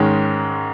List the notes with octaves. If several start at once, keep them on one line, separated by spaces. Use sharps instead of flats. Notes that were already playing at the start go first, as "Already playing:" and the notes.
Already playing: G#2 D#3 G#3 C#4 A#4